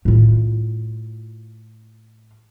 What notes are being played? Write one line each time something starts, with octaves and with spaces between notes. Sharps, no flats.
A2 F4